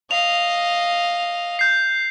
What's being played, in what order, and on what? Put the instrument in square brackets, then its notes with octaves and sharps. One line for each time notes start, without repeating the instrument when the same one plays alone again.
[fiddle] D#5 F5 [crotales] F7
[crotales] G6 C7